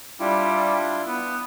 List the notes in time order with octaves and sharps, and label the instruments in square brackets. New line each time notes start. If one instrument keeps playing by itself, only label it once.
[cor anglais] G3 [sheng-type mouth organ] D4 E4 F4
[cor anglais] B3